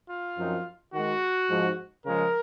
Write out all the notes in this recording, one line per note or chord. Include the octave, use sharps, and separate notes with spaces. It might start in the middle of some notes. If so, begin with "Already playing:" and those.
F4
F#2 F3 C4 D#4
D#3 G#3 D#4 F#4
G#2 F3 G#3 D#4
C#3 F3 G#3 A#4